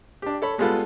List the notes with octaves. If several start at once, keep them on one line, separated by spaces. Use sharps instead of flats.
D4 G4
A4 C#5 B5
G3 G#3 B3 F4 A4 B4